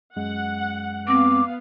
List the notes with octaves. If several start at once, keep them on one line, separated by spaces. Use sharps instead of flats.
F#2 G#3 F#5
B3 C4 F5 D6